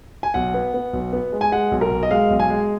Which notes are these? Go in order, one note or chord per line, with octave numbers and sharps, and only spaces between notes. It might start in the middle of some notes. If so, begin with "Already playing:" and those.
G#5
B1 F#5
B3
B3
B1
B3
G#3
G#5
G#3 F#5
B1
A#4
B1
D#5
G#3 F5
B1
G#5
G#3